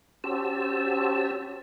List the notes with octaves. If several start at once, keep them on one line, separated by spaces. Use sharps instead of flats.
C#4 F#4 G4 C5 A5 E6